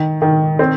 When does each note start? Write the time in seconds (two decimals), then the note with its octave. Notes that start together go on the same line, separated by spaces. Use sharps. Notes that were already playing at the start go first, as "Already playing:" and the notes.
Already playing: D#3
0.22 D#3
0.59 C4